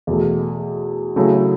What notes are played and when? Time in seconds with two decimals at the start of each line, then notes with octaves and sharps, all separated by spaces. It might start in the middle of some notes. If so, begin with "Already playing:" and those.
0.07 E2 B2 A3
1.16 C#3 F#3 A3 E4 G#4